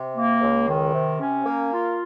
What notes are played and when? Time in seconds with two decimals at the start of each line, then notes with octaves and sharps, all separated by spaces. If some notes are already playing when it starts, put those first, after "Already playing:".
Already playing: C3
0.15 A#3
0.41 C#2
0.68 D#3
0.93 C3
1.20 C#4
1.45 A#3
1.72 F4